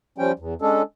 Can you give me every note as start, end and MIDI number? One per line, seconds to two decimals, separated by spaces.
0.18 0.32 53
0.18 0.32 55
0.18 0.32 61
0.18 0.32 79
0.39 0.54 40
0.62 0.82 56
0.62 0.82 61
0.62 0.82 62
0.62 0.82 69